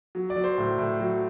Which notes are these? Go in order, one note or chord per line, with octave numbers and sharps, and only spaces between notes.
F#3
D5
F#3
C5
A2
A2
F#3